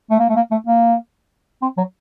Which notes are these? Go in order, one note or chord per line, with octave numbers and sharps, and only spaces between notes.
A3
A#3
A3
A#3
A3
A#3
C4
F#3